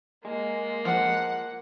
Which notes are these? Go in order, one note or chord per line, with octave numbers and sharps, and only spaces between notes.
G#3 A#3
F3 F#5